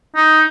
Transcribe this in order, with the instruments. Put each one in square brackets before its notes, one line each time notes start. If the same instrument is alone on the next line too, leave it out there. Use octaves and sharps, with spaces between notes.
[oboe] D#4